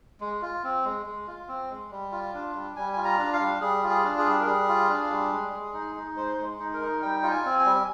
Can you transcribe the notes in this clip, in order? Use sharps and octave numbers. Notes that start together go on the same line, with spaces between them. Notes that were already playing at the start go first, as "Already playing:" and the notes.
G#3
F4
C4
G#3
G#3
F4
C4
G#3
G3
F4
D4
G3
G3 G#5
F4 G#5
A#5
D4
F5
G3
G3 G#4
F4
G#4
D4
G#4
G3
A#4
G3 G#4
F4
D4
G3
G#3
G#3
D#4
D#4
G#3 C5
G#3
D#4
A#4
D#4
G3 G5
F4
G#5
C4
G#5
G3